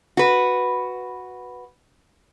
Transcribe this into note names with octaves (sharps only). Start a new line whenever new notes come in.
F#4 B4